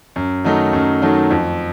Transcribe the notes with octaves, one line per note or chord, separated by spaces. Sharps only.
F#2
D#3 F#3 A3 D#4
F#2
D#3 F#3 A3 D#4
F2